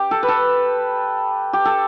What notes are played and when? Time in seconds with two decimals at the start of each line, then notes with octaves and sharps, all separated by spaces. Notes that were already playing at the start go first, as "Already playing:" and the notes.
Already playing: G4
0.11 A4
0.23 B4
0.28 A4
1.53 G4
1.65 A4